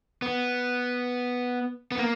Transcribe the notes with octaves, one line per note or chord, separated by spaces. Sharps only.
B3
B3
A#3